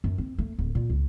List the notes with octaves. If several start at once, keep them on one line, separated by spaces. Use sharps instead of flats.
F#2
C4
A3
D1
A#2
C#2